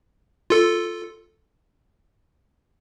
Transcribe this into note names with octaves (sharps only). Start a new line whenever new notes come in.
F4 A4